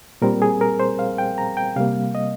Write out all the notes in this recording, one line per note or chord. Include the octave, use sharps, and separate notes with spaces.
A#2 G3 C4 A#4
G#4
A#4
C5
F5
G5
A#5
G5
C3 G3 A#3 F5
D#5